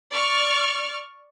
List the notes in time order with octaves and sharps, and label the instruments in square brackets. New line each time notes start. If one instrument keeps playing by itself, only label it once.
[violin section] D5 C#6 F6